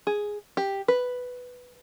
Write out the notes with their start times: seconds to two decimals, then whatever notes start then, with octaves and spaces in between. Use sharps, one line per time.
0.07 G#4
0.57 G4
0.88 B4